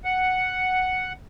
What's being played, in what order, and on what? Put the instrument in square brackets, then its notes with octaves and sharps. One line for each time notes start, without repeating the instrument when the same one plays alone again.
[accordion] F#5